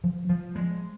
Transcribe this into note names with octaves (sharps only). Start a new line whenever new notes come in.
F3
F3
G#3